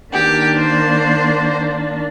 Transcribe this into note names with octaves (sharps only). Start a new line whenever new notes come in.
D#3 A#3 D4 G4
C5